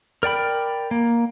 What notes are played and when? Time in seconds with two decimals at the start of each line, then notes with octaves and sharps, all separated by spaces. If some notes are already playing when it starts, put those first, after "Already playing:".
0.23 A#4 D5 G5 B5
0.91 A#3